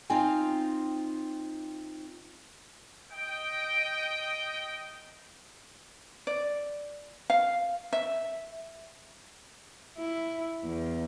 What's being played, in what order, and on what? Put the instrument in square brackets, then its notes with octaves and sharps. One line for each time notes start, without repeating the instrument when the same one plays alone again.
[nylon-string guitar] C4 D#4 F4 G5 G#5
[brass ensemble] D#5 G5
[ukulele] D5
F5
E5
[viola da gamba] E4
E2